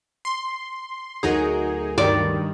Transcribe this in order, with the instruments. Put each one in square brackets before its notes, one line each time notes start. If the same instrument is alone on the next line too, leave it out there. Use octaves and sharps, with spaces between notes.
[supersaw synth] C6
[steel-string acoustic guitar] D2 F#3 A#4 [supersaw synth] D#4 G#4
[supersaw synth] G2 D#3 [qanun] D5